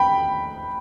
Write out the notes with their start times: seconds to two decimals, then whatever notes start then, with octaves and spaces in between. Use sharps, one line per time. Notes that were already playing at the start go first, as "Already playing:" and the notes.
Already playing: G5 B5